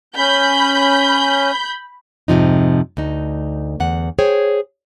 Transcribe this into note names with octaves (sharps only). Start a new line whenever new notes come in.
C#4 B5 G6
F2 G#2 C3 F3 D#4
D2 D#4
E2 F#5
G#4 C5 C#5 G5